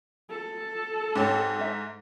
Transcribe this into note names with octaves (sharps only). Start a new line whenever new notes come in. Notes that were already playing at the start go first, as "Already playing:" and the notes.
A4
G#2 C4 G4 C#5
D#4 E5